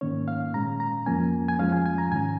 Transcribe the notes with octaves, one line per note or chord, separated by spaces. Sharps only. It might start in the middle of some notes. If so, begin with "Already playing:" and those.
G#2 D#3 A#3 C#4 C#5
F5
A#2 G#3 C#4 A#5
A#5
F2 F3 A#3 C#4 G#5
G#5
F2 F3 G#3 C#4 F5
G#5
G#5
A#5
G#2 D#3 C#4 G#5